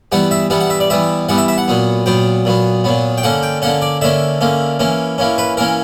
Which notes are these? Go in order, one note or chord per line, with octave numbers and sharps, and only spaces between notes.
E3 G3 B3 F#5
E5
E3 G3 B3 F#5
F#5
E5
D5
E3 G3 B3 E5
E3 G3 B3 F#5
E5
E5
F#5
A#2 F#3 B3
A#2 F#3 B3 G5
A#2 F#3 B3
A#2 F#3 B3
G5
D3 A#3 C#4 F#5
G5
D3 A#3 C#4 F#5
D5
D3 A#3 C#4 E5
D3 A#3 C#4
E3 A#3 C#4
E3 A#3 C#4
B4
E3 A#3 C#4 A#4